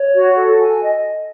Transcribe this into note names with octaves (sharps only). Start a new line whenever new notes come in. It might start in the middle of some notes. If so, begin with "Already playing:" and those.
Already playing: C#5
F#4
A4
G#5
D#5